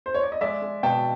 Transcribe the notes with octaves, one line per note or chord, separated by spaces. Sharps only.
C5
C#5
D5
D#5
G#3 D5 E5
G#3
B2 G5 A5